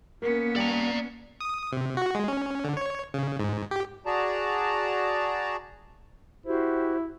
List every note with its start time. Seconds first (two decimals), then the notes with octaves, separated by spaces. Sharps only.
0.22 A#3 B3 C#4 A#4
0.56 G3 D5 G5 A5 A#5
1.40 D#6
1.72 C3
1.97 F#4
2.15 G#3
2.28 C#4
2.64 D3
2.77 C#5
3.14 C#3
3.40 G#2
3.71 G4
4.06 F#4 G#4 D5 A5 A#5
6.46 E4 F#4 G4 C5